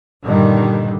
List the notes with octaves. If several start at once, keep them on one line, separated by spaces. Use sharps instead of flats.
G2 A#2 D3 D#3 G3